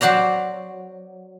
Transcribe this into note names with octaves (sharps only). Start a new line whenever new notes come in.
F#3 F#4 C5 D5 A#5